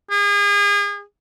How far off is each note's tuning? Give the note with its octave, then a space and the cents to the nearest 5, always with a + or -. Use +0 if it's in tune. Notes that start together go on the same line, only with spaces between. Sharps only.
G#4 -35